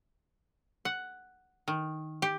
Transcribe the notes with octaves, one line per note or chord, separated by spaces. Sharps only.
F#5
D#3
G4